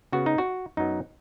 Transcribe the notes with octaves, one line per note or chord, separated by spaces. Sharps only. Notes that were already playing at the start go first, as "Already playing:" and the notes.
C#3 B3 F#4
D#4
F#4
F#2 F#3 B3 D#4